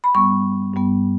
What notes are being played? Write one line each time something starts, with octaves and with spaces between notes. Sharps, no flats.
B5
G2 G3 B3 C#6
G2 G3 B3